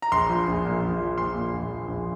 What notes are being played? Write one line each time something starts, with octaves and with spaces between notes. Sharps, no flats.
A#5
A#1 C6
F3
A#1
A#2
A#1
F3
A#1 C6
A#2
A#1
F3
A#1